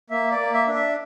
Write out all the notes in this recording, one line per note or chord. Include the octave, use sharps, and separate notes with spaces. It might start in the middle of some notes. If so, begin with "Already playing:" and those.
A#3 E5
D5
A#3
E5
D4
E5